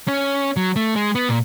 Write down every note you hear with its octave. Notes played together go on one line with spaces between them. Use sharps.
C#4
F#3
A3
G#3
B3
A#2